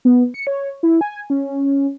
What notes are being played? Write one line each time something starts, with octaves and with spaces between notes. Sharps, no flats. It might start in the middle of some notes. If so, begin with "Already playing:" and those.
B3
C#7
C#5
E4
G#5
C#4